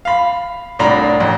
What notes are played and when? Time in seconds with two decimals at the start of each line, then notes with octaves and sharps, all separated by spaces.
0.05 F5 B5
0.79 C2 A2 D4 A#5 B5
1.20 A1